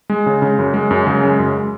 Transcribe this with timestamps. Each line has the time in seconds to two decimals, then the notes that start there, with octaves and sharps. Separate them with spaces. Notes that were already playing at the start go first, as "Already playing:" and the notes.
0.10 G#3
0.26 C#3
0.42 C#3
0.59 F#2
0.74 G#3
0.91 F#2
1.07 C#3
1.23 G#3
1.39 F#2